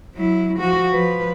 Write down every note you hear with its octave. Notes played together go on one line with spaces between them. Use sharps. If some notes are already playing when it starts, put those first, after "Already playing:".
F#3 E4
F3 F#4
F3 B4